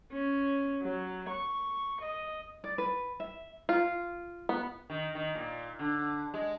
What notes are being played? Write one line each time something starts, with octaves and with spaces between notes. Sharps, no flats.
C#4
F#3
C#6
D#5
D5
B4
E5
F4
B3
D#3
D#3
A#2
D3
G#3